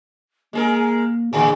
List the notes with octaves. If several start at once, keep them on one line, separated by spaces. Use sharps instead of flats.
G#3 A#3 G#4 A#4
A2 D3 E3 G#4